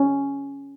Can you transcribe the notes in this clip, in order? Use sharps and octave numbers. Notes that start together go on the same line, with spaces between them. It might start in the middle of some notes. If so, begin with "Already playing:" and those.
Already playing: C#4